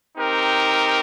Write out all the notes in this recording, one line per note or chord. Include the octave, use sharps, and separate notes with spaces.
C4 D#4 G4 A#4